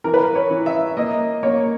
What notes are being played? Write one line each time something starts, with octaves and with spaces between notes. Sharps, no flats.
E3 A#4
B4
A#4
C#5
E3
E5
A#3 D#5
A#3 C#5